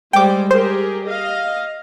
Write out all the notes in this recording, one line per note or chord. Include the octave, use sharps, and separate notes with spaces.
G3 G#3 C5 G5 D6
G4 G#4 A#4 C5
D#5 F5